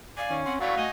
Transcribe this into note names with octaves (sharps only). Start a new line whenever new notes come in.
D5 F5 G#5
D#3 C#4
C4 F#5 C6
E3 F#3 A3 F#4 D5 F5
A3 D#4 D#5 G#5